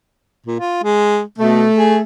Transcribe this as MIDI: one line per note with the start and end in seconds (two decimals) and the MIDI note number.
0.46 0.59 46
0.59 0.81 65
0.84 1.22 56
1.39 1.66 47
1.39 2.03 57
1.76 1.99 68